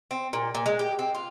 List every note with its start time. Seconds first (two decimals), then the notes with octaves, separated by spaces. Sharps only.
0.11 C4
0.33 A#2
0.55 A#2
0.66 G#3
0.79 G4
0.99 C4
1.15 F4